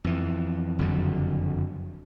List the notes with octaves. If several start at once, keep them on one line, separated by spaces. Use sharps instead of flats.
F2 E3
F#1 F2 D3 F#3